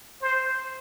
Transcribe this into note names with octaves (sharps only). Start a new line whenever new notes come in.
C5